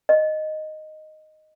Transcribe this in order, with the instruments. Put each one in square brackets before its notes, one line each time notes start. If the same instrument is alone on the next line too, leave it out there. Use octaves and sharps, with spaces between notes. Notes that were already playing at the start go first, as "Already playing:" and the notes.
[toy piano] D#5